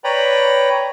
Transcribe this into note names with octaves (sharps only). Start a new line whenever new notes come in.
B4 C#5 D5 G5 A#5 B5